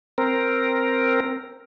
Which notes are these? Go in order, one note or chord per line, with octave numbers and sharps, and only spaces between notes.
C4 A#4